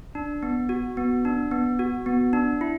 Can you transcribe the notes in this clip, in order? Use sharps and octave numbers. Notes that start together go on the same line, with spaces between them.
D4
B3
F#4
B3
D4
B3
F#4
B3
D4
E4